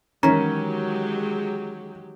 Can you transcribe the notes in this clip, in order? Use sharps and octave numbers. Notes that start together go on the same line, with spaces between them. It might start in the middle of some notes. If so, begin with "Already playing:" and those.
D#3 E3 F#3 G#3 C#4 G4 A#5